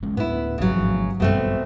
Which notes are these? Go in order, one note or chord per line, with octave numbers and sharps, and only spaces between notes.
A1 G#3 C#4
D2 A2 B3 E4
G#1 C#3 F#3
G#1 F3
A1 G2 B2 A3 C4